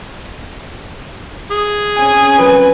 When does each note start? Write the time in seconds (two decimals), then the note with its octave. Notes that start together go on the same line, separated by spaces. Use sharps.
1.51 G#4
1.97 C4 C#4 G#5
2.38 F#3 F4 A#4 B4